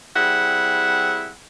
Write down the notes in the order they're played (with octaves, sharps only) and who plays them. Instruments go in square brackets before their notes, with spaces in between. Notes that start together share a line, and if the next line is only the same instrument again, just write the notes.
[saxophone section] G3 C4 E4 G#4 F#5